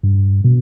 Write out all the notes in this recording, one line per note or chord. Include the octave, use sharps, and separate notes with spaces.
G2
B2